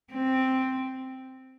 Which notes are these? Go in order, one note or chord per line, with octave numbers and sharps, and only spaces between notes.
C4